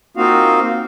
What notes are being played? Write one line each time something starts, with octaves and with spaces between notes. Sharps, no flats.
A#3 C4 D#4 F4 F#4 F5